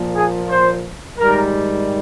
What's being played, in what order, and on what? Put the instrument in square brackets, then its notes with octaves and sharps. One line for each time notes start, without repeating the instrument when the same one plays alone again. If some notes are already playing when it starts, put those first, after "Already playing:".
Already playing: [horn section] A#2 F3
G#4
C5
G#2 D#3 G3 A#4